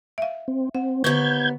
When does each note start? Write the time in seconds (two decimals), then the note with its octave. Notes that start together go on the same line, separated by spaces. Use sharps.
0.18 E5 F5
0.48 C4
0.75 C4 F#5
1.04 D#2 D3 B3 C#6 G6 G#6